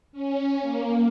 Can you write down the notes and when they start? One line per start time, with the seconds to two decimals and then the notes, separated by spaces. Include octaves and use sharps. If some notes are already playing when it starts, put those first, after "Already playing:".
0.12 C#4
0.61 A#3